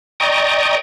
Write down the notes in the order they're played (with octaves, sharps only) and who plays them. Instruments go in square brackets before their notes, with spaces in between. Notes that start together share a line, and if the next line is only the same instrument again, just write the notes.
[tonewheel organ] D5 D#5 G5 A#5 C#6 D#6